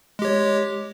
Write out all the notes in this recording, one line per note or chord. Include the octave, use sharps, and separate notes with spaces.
G#3 G4 C#5